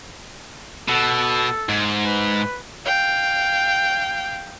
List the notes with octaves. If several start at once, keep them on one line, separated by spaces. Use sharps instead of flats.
B2 A4
G#2
B4
F5 G5